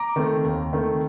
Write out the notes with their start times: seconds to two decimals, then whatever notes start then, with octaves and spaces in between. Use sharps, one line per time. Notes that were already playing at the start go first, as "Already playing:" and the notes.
Already playing: A#5 D6
0.16 D#3 A3 C4
0.44 D#2
0.72 D#3 A3 C4